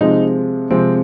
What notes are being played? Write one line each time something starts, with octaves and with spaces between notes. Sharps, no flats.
C3 F3 G#3 D#4
C3 F3 G#3 C4